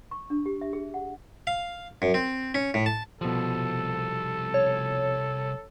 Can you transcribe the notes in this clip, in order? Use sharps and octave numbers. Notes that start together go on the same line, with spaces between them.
C#6
D4
G4
E5
G#4
F#5
F5
F#2
C4
C#4
A2
A5
C2 B2 F3 G3 A4
C#5